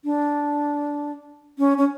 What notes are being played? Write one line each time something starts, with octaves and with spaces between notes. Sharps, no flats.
D4
C#4
C#4